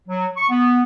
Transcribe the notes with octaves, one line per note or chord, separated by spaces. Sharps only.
F#3
C#6
B3